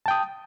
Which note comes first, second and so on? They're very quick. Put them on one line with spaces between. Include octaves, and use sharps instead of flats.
A5 G5 D#6